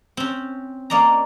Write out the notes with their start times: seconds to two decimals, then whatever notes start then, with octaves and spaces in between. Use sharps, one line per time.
0.17 C4 C#4
0.90 A#3 C#4 D5 D#5 A#5